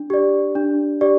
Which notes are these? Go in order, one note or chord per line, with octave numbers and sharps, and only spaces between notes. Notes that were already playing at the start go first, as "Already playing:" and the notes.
Already playing: D4
G4 D5
D4
G4 D5